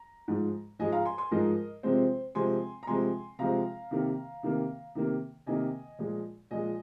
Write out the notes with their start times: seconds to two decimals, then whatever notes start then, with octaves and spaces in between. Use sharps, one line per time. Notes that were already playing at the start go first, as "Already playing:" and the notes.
Already playing: A#5
0.28 G#2 F3 G#3
0.79 G#2 F3 G#3 D#5 G#5
0.92 F5 A#5
1.05 G#5 C6
1.18 G#5 C6
1.31 G#2 F3 G#3 A#4 D#5
1.83 C3 F3 G#3 C4 C5
2.35 C3 F3 G#3 C4 G#5 C6
2.83 A#5
2.87 C3 F3 G#3 C4 G#5 C6
3.39 C3 F3 G#3 C4 F5 A#5
3.91 C3 D#3 A#3
4.43 C3 D#3 A#3
4.95 C3 D#3 A#3
5.47 C3 D#3 A#3 D#5 G#5
5.99 A#2 F3 G#3
6.51 A#2 F3 G#3 D#5 G#5